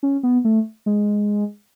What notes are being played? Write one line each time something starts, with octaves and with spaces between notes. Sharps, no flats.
C#4
B3
A3
G#3